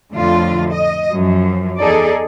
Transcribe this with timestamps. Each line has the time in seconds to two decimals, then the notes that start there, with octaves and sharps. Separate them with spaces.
0.12 F2 A2 D3 F4
0.72 D#5
1.14 F#2 F3
1.79 E2 D#4 G#4 A4 D5